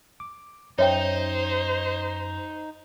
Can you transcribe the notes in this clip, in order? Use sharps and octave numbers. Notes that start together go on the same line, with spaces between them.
D6
F#2 D#4 C5 C#5 E5 G5